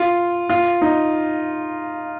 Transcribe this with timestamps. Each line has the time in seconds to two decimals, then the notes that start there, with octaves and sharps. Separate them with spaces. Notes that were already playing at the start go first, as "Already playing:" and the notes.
Already playing: F4
0.49 F4
0.81 D#4